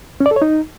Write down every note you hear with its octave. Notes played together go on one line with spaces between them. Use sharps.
C#4
D5
A4
C#5
D#4